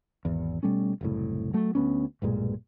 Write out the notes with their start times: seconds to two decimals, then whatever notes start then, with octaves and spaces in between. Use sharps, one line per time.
0.25 G#1 E2
0.63 B2 G3 A3 C#4
1.01 F#1 C2 A2
1.54 F#3 A3
1.75 D2 B3 C#4
2.22 B1 G2 A#2 G#3